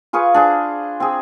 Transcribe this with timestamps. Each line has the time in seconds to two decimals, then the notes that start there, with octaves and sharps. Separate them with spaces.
0.13 F4 G#4 B4 C#6
0.34 D4 G#4 C5
1.00 C4 G#4